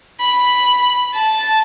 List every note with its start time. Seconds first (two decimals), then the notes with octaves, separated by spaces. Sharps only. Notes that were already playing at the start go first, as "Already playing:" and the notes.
0.20 B5
1.15 A5